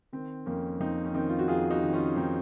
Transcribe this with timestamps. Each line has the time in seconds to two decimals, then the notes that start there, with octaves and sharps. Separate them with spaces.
0.12 D#3 C4
0.46 F2 A#3 C#4
0.80 F2 C4 D#4
1.05 C#4
1.14 D#3 C4 D#4
1.29 F4
1.39 F#4
1.48 F2 F4 G#4
1.71 D#4 F#4
1.83 D#3
1.93 C#4 F4
2.16 F2 C4 D#4